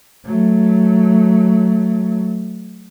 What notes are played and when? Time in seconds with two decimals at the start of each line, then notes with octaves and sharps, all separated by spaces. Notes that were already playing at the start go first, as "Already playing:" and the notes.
0.25 F#3 A3